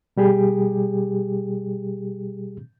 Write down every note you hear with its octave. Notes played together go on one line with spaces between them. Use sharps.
B2 G3 G4 G#4